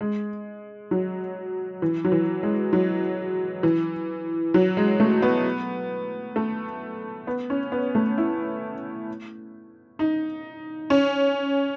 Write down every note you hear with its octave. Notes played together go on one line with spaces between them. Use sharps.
G#3
F#3
E3
F#3
E3
G#3
F#3
E3
F#3
G#3
A3
B3
A3
B3
C#4
B3
A3
E4
D#4
C#4